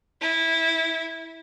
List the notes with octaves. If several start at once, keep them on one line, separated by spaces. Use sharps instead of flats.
E4